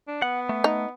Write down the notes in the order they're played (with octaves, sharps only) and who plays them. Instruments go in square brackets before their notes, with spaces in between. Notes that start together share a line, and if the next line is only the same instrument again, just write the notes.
[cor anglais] D4
[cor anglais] B3 [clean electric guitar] F#5
[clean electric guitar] A3
[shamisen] D#4